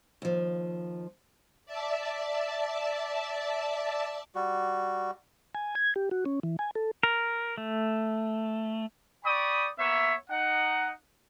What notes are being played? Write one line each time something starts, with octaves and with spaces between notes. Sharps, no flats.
D#2 F3
D5 E5 A5
G3 F#4
G#5
G#6
G4
F#4
C#4
E3
G#5
A4
A#4
A3
D5 G5 B5 C#6 D#6
A#3 B3 C#5 E5
D#4 F#5